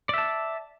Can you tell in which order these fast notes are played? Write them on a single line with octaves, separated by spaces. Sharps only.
D5 E5 A5